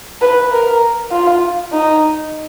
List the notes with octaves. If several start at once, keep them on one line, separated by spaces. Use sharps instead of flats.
B4
A#4
F4
D#4